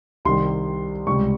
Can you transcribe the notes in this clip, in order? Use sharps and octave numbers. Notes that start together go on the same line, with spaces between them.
C2 C3 D#3 G3 C6
C#2 C3 G3 C#6